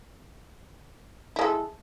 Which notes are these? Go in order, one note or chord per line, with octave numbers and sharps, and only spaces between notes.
G#3 E4 A4